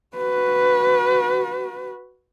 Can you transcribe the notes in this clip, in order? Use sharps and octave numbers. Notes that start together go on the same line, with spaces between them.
F#4 B4